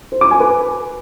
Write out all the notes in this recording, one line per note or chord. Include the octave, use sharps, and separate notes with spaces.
C5
D6
G#5
B4